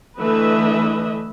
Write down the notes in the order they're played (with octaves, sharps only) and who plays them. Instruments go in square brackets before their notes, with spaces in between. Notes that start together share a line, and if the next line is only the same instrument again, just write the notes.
[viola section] D3 E3 A3 B4 D#5 E5